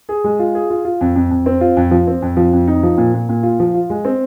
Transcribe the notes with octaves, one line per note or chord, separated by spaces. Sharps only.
G#4
G#3
F4
G#4
F4
F4
F2
F2
F2
C4
F4
F2
F3
C4
F2
F3
F2
D#4
F3
A#2
A#2
A#2
F4
F3
F4
G#3
C4